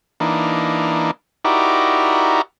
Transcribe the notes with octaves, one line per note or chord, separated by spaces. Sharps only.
E3 A#3 D4 D#4
D#4 E4 F#4 G4 A#4 D5